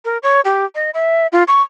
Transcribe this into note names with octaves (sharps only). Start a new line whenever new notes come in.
A#4
C#5
G4
D#5
E5
F4
C#6